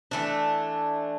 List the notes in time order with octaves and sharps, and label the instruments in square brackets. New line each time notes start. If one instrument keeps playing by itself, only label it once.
[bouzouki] E3 A3 D4